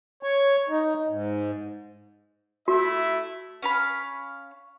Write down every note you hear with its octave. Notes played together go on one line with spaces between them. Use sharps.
C#5
D#4
G#2
A3 E4 F#4 E5
C#4 F5 B5